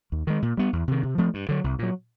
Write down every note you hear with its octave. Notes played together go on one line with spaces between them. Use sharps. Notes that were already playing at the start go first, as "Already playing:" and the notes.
D#2
D#3 G#3
A#2
G3 B3
E2
C3 D#3
C3
F3 A3 C4
G2
D3 F#3
C2
A#2 F#3